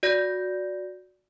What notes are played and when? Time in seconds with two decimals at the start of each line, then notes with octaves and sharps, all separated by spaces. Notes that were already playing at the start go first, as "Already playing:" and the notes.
0.03 F#4 D5 G6 A#6